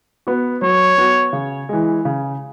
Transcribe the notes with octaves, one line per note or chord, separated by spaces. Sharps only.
B3 F#4
F#3 C#5
B3 F#4
C#3
E3 G#3
C#3